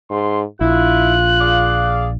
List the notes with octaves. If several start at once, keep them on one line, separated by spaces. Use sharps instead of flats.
G#2 C6
A#1 E4 F4 F#6
G#4 D5 F5